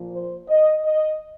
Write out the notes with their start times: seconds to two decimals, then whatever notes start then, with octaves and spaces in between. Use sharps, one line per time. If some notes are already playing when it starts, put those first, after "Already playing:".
Already playing: A#2 F3
0.12 C5
0.48 D#5
0.85 D#5